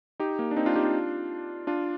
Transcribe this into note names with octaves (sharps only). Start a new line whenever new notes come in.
D#4 G4
A#3
D4
C4 D#4
D4 F4
D#4 G4
D4 F4
D4 F4